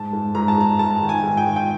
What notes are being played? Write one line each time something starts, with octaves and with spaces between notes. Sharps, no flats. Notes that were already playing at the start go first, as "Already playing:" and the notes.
Already playing: G#2 A5
G#2
G#2 A#5
A5
G#2 A#5
G#2 A5
D#3
G#5
G#2
G5
D#3
G5